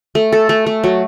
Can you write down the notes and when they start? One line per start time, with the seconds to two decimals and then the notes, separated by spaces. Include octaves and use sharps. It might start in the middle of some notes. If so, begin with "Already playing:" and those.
0.15 A3
0.32 A4
0.49 A3
0.66 A3
0.84 F#3